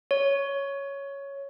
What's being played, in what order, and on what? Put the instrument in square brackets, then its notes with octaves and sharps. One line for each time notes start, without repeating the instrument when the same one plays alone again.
[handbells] C#5